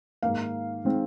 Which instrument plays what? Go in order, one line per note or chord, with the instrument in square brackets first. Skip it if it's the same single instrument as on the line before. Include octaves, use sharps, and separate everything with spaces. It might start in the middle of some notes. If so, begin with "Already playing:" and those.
[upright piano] G#2 D#3 A#3 [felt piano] F5
[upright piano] D#3 G#3 C4